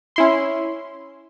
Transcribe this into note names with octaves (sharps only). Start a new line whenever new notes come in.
C#4 E4 C6